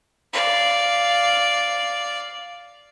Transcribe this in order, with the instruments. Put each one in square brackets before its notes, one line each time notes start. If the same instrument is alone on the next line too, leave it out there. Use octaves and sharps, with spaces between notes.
[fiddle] D5 F5